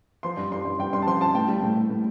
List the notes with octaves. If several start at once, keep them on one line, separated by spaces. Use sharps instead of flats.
F3 C6
G2
G2 C6
G2
G2 G5
G2 C6
A5
F3 C6
F3 A5
A2 G5
G3
A2
A2
A2